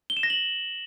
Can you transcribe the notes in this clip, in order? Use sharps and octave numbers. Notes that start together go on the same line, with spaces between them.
G7
E7
A#6
F#7